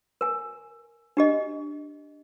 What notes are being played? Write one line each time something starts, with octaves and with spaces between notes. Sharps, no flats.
A#4 G#5
D4 G4 D#5